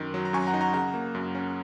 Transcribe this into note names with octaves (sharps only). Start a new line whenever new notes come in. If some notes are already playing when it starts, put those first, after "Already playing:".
Already playing: F#2 D#3
F#3
A#5
F#2 G#5 C#6
F#5 A#5
D#4
F#5 A#5
C#3 F#5 A#5
A#3
F#2
C#4